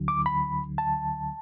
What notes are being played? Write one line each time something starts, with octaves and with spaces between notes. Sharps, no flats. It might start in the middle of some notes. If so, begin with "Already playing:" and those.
Already playing: D2 D3 F#3
D6
B5
A5